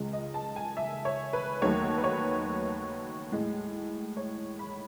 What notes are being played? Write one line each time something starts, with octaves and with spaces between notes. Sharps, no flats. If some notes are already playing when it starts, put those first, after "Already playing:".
Already playing: C#2 C#3 G#3
D#5
A5
G#5
E5
C#5
B4
D#2 D#3 F#3 A3 C#5
B4
C#5
A2 G#3
C#5
B5